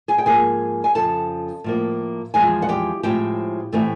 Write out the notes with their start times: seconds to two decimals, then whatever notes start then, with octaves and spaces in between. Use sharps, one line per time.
0.08 G#4 G#5
0.18 G5
0.25 G#2 F3 A#3 G#4 G#5
0.84 G#5
0.95 F2 C#3 F3 A4 A5
1.64 A2 F3 A#3
2.34 E2 C#3 F3 G#3 G#4 G#5
2.62 F#5
2.69 G4 G5
3.03 A2 F3 G#3 C4 G4 G5
3.73 A2 E3 A3 C4